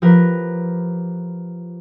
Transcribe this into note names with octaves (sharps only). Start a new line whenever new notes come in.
F3 A#3 G4 A#4 B4